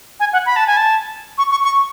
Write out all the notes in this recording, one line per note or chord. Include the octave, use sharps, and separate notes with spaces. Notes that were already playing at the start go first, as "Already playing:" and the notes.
G#5
F#5
B5
A5
G#5
A5
C#6
C#6
C#6